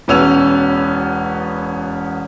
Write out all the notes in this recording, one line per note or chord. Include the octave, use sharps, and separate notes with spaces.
E1 B3 C#4 E6 F7